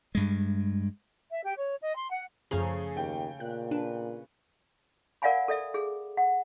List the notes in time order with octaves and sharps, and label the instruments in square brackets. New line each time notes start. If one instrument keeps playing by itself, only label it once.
[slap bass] G2 G#3
[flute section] E5
G4
C#5
D#5
C6
F#5
[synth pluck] F#2 F3 A#5 [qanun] C#3 A3 [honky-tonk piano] G#4
[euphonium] D#2 [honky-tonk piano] G5
[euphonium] A#2 [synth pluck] F#6
[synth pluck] D4 [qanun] B4
[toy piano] A#4 D5 F5 F#5 G#5 B5
A4 D5 E5
G#4
F#5